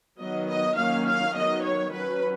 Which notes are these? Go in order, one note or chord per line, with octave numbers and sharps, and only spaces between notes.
D#3 F#3 B3 D#5
D#5
D#3 F#3 A#3 C#4 F5
F5
D#3 F#3 B3 D#5
C#5
F#3 C#4 B4